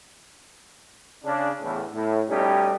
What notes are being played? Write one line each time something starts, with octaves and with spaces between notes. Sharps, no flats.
C#3 D4
E2 A2
A2
B2 G3 A3 C#4 D#4 G4